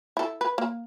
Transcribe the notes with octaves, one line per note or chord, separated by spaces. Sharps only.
E4 A4
B4
A#3